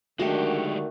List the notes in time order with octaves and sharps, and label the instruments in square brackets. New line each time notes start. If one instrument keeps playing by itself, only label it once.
[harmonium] D3 D#3 [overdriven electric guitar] G#3 G4 [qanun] A3 F#4